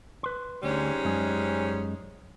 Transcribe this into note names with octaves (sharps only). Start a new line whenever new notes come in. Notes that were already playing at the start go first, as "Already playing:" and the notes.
B4 C6
D2 G#2 G3 C#4
F#2 G#3